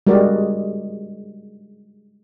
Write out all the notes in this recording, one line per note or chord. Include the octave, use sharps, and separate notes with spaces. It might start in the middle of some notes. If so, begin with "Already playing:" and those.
G3 G#3 F#4 A#4 D5